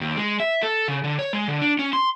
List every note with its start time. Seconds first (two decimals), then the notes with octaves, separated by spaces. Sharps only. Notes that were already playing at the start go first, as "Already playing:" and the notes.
0.01 D#2
0.17 G#3
0.40 E5
0.63 A4
0.88 C#3
1.04 D3
1.19 C#5
1.33 G#3
1.48 D3
1.62 D4
1.79 C#4
1.93 C6